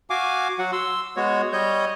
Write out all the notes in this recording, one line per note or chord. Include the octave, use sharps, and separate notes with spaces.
F#4 F5 G#5 D6
F#3 F#4 F#5
C6 E6
G#3 B3 F#4 C#5
G3 C#5 D#5 G6